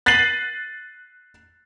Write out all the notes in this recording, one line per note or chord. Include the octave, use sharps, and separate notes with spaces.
F#6 A6 B6 C7 D#7 F#7